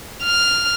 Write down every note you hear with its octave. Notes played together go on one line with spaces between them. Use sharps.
F6